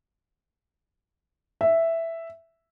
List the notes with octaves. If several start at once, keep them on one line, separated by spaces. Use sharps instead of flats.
E5